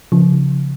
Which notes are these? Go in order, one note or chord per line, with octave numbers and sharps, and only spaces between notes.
C#3 F3